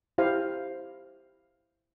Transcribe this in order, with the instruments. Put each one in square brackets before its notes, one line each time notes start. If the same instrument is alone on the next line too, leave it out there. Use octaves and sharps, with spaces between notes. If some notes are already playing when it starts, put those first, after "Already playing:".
[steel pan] E4 G4 C5 F5